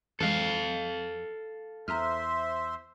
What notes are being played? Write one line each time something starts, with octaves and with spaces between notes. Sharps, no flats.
F2 E3 G#3 A4 F5
E2 C5 E5 A#5 C6 F6